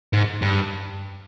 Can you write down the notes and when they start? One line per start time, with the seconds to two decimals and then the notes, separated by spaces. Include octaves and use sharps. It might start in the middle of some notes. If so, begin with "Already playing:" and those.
0.13 G#2
0.42 G2